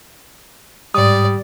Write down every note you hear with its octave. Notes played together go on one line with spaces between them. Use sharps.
G#2 G3 D5 D#6